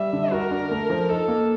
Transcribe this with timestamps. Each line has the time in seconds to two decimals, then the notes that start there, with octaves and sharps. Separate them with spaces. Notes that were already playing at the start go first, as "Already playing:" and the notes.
Already playing: G3 E5
0.13 D3
0.32 F#4 A#4
0.51 D4
0.71 A3
0.90 F3
1.09 D#4 A4
1.28 A#3